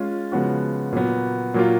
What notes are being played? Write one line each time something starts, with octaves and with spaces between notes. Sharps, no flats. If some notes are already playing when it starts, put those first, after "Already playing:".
Already playing: G#3 C#4 F4
C#3 F3 G#3 B3 F#4
A#2 F#3 B3
A#2 F#3 A#3 F4